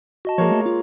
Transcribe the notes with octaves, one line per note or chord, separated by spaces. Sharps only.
F#4 D#5 A5
F3 G#3 A#3 C#5
A3
F4